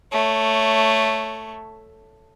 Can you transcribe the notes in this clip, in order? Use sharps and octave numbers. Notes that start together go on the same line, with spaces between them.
A3 C#5